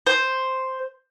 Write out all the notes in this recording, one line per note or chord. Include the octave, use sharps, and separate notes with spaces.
C5